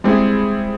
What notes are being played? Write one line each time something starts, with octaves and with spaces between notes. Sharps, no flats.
G3 G#3 C4 E4 G#4